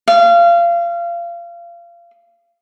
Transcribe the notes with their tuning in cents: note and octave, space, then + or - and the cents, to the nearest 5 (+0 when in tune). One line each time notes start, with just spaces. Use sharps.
F5 -25